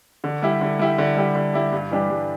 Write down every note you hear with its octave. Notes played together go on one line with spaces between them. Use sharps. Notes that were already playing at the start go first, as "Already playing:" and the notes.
D3
G3 E4 G4
D3
G3 E4 G4
D3
G3 E4 G4
D3
G3 E4 G4
G2
E3 G3 D4 G4
G2